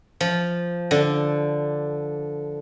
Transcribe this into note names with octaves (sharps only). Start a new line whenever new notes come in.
F3
D3